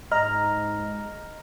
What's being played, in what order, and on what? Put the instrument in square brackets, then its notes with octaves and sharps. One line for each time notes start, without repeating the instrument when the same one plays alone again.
[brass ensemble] G#2 G#3 [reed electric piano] D#5 [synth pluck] A#5 [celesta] F6